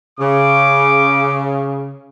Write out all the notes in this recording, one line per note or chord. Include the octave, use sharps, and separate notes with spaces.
C#3 D6